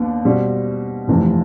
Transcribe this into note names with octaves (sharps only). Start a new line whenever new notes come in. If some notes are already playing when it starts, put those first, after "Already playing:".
Already playing: D#2 B3 D4
B2 G3 C4
F1 F2 C3 E3 A3